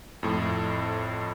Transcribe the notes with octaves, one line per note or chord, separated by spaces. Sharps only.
F2 A2